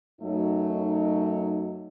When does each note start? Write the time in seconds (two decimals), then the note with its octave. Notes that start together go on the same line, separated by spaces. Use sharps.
0.21 F#2 F#3 A3 D#4